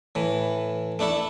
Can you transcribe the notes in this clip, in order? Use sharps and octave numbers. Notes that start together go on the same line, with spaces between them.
A2 E3
A3 D4 E4 A4